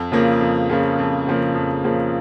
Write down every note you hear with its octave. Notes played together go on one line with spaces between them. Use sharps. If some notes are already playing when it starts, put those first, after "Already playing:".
Already playing: F2
C#3 F3 A#3
F2
C#3 F3 A#3
F2
C#3 F3 A#3
F2
C#3 F3 A#3